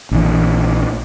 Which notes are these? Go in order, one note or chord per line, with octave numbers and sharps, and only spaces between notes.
A#1 E3